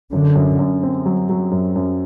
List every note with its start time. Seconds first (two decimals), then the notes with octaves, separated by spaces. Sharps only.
0.13 F#2 D3
0.35 F#2
0.59 F#2
0.83 C4
1.06 F#3
1.29 F#3
1.51 F#2
1.76 F#2